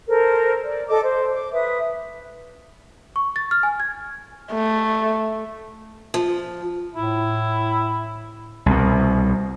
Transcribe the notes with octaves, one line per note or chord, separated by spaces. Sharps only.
A4 A#4 C5
D5
A4 D#5 D6
C5
D6
B4 E5 D#6
C#6
A6
F6
G#5
G#6
A3
F3
A2 E4
C2 B2